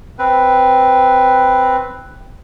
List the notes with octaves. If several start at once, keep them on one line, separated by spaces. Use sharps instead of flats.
C4 B4